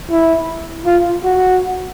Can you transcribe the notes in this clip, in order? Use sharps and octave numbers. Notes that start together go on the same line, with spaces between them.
E4
F4
F#4